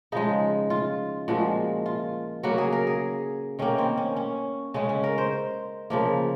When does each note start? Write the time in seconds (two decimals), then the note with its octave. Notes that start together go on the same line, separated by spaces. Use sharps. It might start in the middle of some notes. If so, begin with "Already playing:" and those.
0.12 C#3 F3 G#3 D#4
0.70 F4
1.28 A#2 F3 G#3 F#4
1.86 F4
2.43 C#3 F#3 A#3 F#4
2.58 G#4
2.72 A#4
2.87 G#4
3.59 D#3 A#3 C#4
3.78 C4
3.97 C#4
4.17 C#4
4.74 C#3 G#3 C#4
4.89 C#4
5.04 A#4
5.18 C5
5.90 C#3 F3 A#3